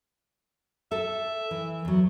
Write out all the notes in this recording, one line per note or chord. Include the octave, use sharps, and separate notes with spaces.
A4 E5
E3
E2 F#3